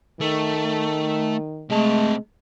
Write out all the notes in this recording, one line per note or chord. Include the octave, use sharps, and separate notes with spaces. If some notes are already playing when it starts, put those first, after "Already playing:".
D#3 A3
C3 G#3 A3 A5